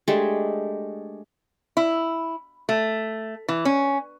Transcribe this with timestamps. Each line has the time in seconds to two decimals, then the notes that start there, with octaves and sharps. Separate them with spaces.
0.08 G#3 A3 D4 G4
1.77 E4
2.69 A3
3.48 E3
3.65 C#4